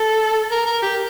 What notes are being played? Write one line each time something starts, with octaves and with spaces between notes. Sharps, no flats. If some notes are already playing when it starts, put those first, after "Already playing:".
Already playing: A4
A#4
A#4
G4